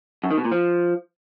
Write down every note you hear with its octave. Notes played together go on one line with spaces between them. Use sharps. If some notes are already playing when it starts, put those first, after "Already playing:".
F#2
D#3
B2
A#2
F3